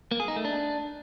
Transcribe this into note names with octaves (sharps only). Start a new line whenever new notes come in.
A#3
G#4
D#4
A3
D4